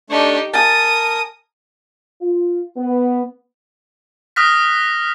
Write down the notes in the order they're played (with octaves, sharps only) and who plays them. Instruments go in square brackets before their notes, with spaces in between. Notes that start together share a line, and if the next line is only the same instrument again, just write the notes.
[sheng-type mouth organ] A3 D4 C#6 [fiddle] D#4 G4
[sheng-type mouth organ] A#4 [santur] G#5 A5 [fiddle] D#6
[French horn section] F4
B3
[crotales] D#6 F6 F#6 A#6 B6